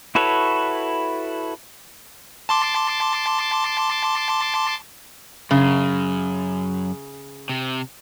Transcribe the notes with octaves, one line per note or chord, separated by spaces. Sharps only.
E4 F#4 A4 B4 C#5
A5 C6 D6
F#2 C#3
C3